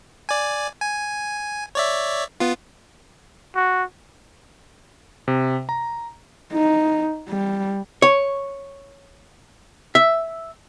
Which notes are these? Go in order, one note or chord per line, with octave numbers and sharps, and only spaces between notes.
D5 G#5
G#5
C#5 D5 E5
B3 F4
F#4
C3
A#5
D#4
G3
C#5
E5